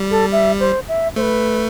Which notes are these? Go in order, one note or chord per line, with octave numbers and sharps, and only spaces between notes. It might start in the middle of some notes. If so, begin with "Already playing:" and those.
Already playing: G3
A4
E5
C5
E5
A3 C5
B4